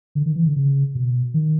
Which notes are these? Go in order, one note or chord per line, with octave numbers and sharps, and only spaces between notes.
D3
D#3
E3
D3
C#3
B2
D#3